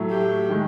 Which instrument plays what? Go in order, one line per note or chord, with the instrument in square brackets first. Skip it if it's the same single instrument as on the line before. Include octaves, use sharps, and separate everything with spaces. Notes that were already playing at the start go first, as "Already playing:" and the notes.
Already playing: [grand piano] A2 F#3 A3
[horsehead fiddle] G4
[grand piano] D#3 G#3